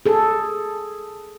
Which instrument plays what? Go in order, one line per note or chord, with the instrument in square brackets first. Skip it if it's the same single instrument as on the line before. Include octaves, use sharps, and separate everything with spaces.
[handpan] G#4 A4